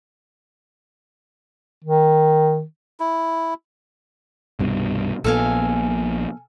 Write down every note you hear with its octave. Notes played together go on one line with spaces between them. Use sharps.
D#3
E4
C2 G2 B2
A#1 A#2 B3 A4 F5 G#5